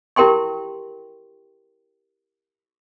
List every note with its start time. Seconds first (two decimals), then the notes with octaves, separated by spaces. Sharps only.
0.16 E4 G4 A#4 G5 C6 C#6